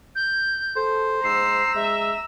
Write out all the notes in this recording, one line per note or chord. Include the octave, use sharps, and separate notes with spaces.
G6
A4 C5
G#2 A#5 E6 C7
G#3 E5